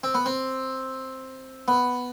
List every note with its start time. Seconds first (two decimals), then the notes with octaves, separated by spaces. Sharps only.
0.04 C4
0.15 B3
0.26 C4
1.68 B3